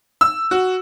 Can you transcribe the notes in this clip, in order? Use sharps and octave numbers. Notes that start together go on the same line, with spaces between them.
E6
F#4